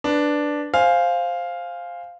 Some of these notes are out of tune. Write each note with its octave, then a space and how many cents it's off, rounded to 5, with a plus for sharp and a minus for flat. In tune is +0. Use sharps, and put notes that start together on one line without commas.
D4 +0 B4 +0
C5 +0 F5 +0 G#5 +0